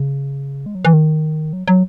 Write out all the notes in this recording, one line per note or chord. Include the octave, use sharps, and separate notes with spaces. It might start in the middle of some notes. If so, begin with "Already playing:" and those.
Already playing: C#3
G#3
F#3
E3
D#3
F#3
F#3